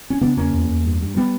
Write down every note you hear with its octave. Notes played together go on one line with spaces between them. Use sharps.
C#4
C#3 B3 D4
E2 A#3 C#4
E2
E2
G2
G2
G3 B3